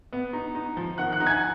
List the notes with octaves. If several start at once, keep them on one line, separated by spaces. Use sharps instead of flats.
B3
D#4
D#4
F3
D#3 F#5 F#6
F#5 F#6
D#4
G#5 G#6